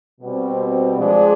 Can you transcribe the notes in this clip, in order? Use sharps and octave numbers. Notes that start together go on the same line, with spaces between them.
B2 G3 C4
F3 G#3 D4 G#4 D5